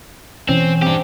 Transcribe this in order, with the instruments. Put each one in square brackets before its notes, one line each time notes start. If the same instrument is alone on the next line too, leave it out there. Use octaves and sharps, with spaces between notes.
[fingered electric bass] B2 E3 [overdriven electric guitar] C4 [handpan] C#4
[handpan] C4 [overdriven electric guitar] D4 G4